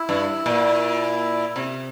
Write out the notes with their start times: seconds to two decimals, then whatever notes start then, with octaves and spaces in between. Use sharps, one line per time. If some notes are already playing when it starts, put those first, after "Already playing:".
Already playing: E4
0.09 G2
0.46 A#2
1.56 C3